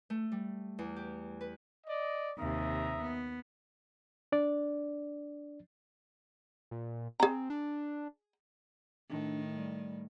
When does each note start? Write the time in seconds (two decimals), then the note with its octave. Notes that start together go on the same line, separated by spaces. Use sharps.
0.10 A3
0.32 G3
0.79 E2
0.96 G4
1.41 B4
1.87 D5 D#5
2.38 D#2 C3 E5 A#5 D#6
3.01 B3
4.32 D4 D5
6.71 A#2
7.20 C4 G#4 A#5
7.50 D4
9.10 A2 D#3 D4
9.56 G3